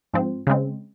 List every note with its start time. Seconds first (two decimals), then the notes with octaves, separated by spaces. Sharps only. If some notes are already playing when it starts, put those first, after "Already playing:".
0.13 G#2 F3 C4
0.47 C#3 G#3 C4